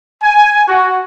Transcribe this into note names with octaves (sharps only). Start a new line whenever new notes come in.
G#5
F#4